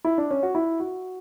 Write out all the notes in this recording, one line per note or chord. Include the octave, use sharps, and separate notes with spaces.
E4
D4
C#4
F#4
E4
F#4